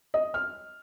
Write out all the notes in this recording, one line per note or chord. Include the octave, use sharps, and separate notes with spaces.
D#5
F6